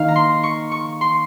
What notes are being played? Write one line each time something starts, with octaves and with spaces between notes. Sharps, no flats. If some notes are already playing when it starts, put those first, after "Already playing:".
Already playing: D#3 A#3 F5
A#5
C6
C#6
C#6
C6